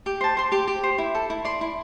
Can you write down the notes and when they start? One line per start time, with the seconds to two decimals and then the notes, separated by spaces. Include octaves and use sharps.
0.06 G4 D6
0.21 C5 A5
0.37 C5 C6
0.52 G4 D6
0.68 G4
0.83 C5
0.98 E4
1.15 A4
1.30 E4
1.45 D5 C6
1.61 E4